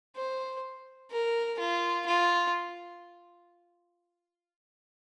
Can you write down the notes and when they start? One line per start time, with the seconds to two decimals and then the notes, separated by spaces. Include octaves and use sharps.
0.16 C5
1.11 A#4
1.59 F4
2.06 F4